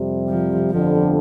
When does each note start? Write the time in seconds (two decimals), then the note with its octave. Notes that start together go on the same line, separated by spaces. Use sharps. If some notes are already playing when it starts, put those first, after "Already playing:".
Already playing: F2 C3 G3
0.29 F3
0.70 G1 F2 D3 F3